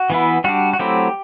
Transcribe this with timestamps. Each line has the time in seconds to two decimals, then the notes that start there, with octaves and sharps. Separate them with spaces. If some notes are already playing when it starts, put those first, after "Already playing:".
Already playing: F#4
0.10 E3 B3 E4
0.44 G3 D4 F#4
0.73 F#4
0.79 F#3 A3 C4 E4 G4